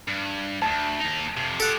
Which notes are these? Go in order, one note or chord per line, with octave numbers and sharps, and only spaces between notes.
G2
D2 G#2 A5
D#2 D#4
F2 C3
F3 G4 A4 F#5